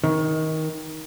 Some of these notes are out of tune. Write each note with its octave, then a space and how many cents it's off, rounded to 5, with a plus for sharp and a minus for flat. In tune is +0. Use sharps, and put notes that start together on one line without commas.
D#3 +20